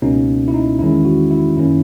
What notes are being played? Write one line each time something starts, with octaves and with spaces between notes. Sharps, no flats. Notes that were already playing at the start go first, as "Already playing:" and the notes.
C#2 B2 A#3 C#4 D#4
E4
D#4
E2 D#3 G#3 C#4 E4
F#4
E4
F#2 D#3 A#3 C#4 E4